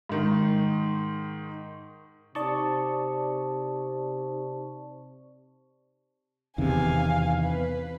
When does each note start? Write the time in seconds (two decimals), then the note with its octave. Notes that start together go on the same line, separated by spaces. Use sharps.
0.09 G#2 D#3
2.35 C3 D#4 D5 A5 C#6
6.58 E2 C3 D#3 F5 G#5
7.43 B4